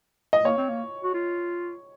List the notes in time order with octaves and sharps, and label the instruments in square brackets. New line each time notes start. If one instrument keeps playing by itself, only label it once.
[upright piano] D#5
[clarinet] A#3 [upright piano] C#5
[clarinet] C4
A#3
F#4
F4